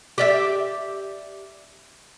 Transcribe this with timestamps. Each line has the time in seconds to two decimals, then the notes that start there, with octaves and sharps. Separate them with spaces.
0.18 G4 D5 E5